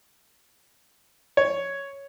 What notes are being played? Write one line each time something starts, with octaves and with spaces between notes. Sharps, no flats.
C#5